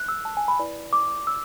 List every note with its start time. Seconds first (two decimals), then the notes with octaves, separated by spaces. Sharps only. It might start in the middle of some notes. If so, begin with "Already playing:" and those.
Already playing: F#6
0.08 E6
0.25 A5
0.37 G#5
0.48 B5
0.59 E4 B4 D5
0.93 D6
1.27 E6